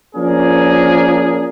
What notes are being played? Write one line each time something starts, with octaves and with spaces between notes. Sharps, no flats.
F3 A#3 C#4 D4 G#4 A#4